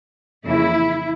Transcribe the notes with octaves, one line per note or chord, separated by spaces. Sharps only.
F2 C#3 E3 A#3 E4